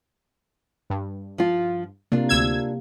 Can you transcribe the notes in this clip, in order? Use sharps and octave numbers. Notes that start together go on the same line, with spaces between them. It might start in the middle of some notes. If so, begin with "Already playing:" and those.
G2
F3 F4
C3 A#3 D4 F4
D2 E6 G#6